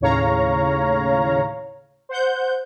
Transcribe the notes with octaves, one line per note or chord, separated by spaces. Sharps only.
D#2 A2 C#3 C#5 F5 A#5
C5 F#5 G6